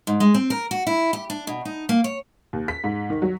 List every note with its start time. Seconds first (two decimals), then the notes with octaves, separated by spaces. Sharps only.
0.07 G#2
0.20 G#3
0.34 C4
0.50 A#4
0.71 F#4
0.87 E4
1.13 G4
1.30 D4
1.47 B2
1.65 D#4
1.89 A#3
2.04 C#5
2.53 D#2
2.68 B6
2.84 G#2
3.10 D#3
3.22 F#3